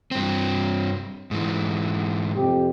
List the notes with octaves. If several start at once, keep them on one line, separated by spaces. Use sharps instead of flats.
G2 C4
G#2 E3
F2 C3 G4